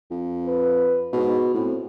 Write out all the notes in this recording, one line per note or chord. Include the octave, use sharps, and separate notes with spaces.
F2
B4
G#2 B2
A2 C4